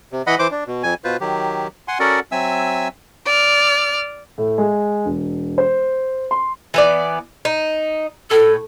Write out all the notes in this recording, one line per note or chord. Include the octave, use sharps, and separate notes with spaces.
C3
E3 D#5 F#5 B5
E3 C5 D6
D4
B2
F2 G#5
B2 F4 B4 C5
D#3 F#3 G4
F#5 G#5 C6
C#4 F#4 A4 A#4 D5 F#5
F#3 C4 E5 G#5 E6
D5 F6
A2
G#3
E1
C5
C6
E3 B3 D5
D#4
A2 A4